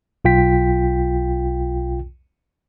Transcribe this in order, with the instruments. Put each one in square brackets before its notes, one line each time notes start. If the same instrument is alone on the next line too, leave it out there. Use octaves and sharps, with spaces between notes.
[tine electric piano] B1 F4 G5 B6